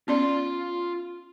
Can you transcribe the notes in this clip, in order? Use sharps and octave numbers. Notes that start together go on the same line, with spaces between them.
B3 C#4 F4 D5 C6